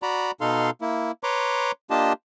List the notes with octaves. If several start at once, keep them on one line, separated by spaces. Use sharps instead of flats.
F#4 D5 A#5 B5
B2 D#4 A4 F5 C6
A#3 E4
B4 C#5 A#5 C6 D6
A#3 D4 F4 G4 D#5 A5